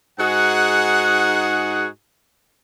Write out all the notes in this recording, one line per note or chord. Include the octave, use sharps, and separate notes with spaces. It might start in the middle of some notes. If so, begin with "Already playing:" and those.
G#2 D#4 F#4 G#4 F#5